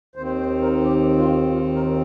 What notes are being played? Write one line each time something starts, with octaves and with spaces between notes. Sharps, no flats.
D#2 D#3 C4 C5
C5
A#4
G4
F4
F4
A#4